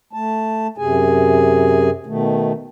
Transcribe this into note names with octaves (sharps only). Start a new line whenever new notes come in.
A3 A5
F#2 C3 G#4 G#5
B2 D#3 A3